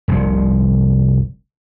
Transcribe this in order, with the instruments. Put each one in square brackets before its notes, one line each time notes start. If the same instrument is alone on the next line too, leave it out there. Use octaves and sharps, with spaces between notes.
[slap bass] F1 C2 G2 C3